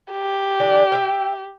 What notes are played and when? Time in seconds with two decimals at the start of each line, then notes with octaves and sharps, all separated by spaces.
0.12 G4
0.60 D3 E3 D4
0.92 E5 F5 G5